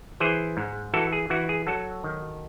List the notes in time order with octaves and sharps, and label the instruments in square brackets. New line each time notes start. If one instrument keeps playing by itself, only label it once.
[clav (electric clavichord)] E3 G#4 C5
G#2
E3 F#4 A4
G#4
E3 F#4
G#4
F#3 F#4 A4
D#3